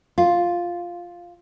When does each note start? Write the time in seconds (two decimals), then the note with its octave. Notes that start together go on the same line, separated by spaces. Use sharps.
0.18 F4